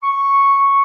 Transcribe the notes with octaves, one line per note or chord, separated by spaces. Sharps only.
C#6